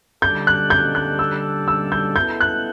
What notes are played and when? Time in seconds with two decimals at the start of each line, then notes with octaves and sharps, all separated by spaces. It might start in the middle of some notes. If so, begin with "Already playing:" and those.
0.22 D3 G3 D4 A4 D5 G6
0.47 F#6
0.70 G6
0.95 F#6
1.19 E6
1.68 E6
1.92 G6
2.16 B3 E4 A4 G6
2.41 F#6